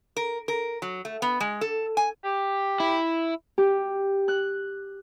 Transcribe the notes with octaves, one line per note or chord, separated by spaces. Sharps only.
A#4
A#4
F#3
A3
B3
G#3
A4
G#5
G4
E4
G4
F#6